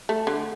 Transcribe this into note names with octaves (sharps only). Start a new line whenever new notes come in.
A3
D3